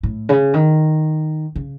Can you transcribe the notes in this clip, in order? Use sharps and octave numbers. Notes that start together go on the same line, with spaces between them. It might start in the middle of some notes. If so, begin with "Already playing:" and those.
A2
C#3
D#3
C#3